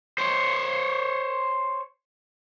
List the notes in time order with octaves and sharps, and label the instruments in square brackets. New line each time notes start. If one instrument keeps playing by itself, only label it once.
[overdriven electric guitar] C5 C#5